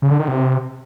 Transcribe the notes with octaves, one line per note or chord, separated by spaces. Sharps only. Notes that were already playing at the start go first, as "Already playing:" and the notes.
C#3
D3
D#3
C3